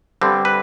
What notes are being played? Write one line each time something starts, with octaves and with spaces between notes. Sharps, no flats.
G2 D3 G3 C4
B4